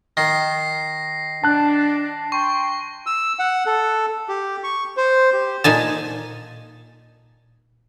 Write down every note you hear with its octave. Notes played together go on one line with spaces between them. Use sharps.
D#3 A#6 C7
D4 A5 F#6
G5 C6 C#6
E6
F#5
A4
G4
C#6
C5
G4
A#2 D#4 G#5 A5